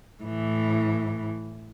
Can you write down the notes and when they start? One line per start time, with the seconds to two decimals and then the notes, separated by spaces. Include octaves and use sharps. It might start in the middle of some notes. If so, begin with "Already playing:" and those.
0.23 A2 E3